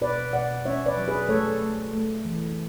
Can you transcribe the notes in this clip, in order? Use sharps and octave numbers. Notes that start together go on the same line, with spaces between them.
B2 B4 D5
B2 D5 F#5
C#4 C#5 E5
B4 D5
F#3
G#4 B4
A3 A4 C#5
A3
A3
E3